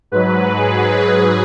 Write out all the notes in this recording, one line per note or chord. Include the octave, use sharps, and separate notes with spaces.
G#2 F#3 B4
G#4